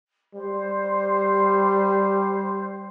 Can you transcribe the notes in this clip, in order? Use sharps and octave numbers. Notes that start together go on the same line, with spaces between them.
G3 C5